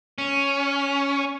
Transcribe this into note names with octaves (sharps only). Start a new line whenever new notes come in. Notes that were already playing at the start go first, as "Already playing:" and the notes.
C#4